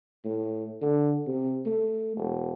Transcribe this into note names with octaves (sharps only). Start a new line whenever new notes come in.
A2
D3
C3
A3
E1